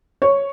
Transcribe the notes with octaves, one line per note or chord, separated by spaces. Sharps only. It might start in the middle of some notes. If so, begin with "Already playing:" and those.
C#5